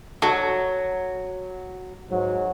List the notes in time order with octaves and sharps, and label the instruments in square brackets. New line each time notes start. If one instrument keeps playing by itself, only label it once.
[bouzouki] F#3 [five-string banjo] F#4 A4
[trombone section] G#2 F#3